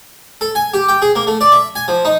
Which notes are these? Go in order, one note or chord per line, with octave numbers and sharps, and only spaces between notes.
A4
G#5
G4
G5
G#4
A#3
A3
D5
E5
G#5
F3
D#4